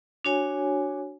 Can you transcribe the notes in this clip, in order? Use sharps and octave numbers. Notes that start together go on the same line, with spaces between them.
D4 F#4 C#5 G#5